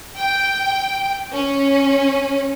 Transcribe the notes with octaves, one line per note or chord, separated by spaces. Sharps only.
G5
C#4